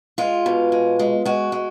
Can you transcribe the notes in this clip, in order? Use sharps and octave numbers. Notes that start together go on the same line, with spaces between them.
G#3 F4
B2
G#3
G#3
G#3 F#4
G#3